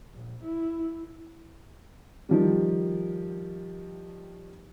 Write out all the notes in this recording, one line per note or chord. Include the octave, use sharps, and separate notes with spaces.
A#1
E4
D#3 F3 G3